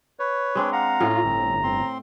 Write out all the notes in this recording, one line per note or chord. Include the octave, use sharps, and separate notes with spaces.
B4 C#5
G#3 C4 D4
F5 F#5 A#5
A2 C#4 F4
G1 C4
C4 C6